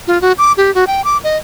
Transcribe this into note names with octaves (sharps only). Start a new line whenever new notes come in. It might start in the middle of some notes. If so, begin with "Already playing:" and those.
F4
F#4
D6
G4
F#4
G5
D6
D#5